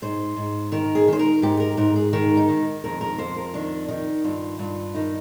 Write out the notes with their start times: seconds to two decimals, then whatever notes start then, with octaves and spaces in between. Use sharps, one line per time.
0.02 G#2 C5
0.36 G#2
0.72 D#3 A#4
0.95 G#4
1.08 D#3 C5
1.19 A#4
1.42 G#2 G4
1.60 A#4
1.77 G#2 A#4
1.96 G#4
2.13 D#3 A#4
2.37 D#4
2.49 D#3
2.84 F2 A#4
3.01 A#4
3.18 F2 C5
3.36 A#4
3.54 D#3 D4
3.88 D#3 D#4
4.24 G2 F4
4.59 G2 F4
4.94 D#3 D#4